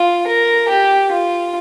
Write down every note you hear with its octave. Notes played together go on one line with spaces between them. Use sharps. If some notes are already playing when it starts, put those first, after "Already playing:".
Already playing: F4
A#4
G4
F4